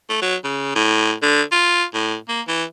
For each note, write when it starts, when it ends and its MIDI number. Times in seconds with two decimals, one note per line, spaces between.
0.10 0.19 57
0.22 0.36 54
0.44 0.74 49
0.76 1.13 45
1.22 1.42 50
1.52 1.84 65
1.94 2.16 45
2.29 2.42 58
2.48 2.64 52